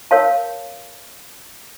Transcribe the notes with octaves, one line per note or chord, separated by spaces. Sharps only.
A#4 C#5 F5 A5